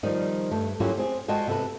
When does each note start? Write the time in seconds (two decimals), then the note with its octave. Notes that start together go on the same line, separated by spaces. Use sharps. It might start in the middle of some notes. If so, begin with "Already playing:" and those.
0.03 D#3 F3 G3 D#4
0.51 G2 A3
0.80 F#3 A#3 C#4 E4 F4 G4
0.97 C4 G#4
1.28 G#3 F4 F#4 D#5 G5 A5
1.47 C3 A4 B4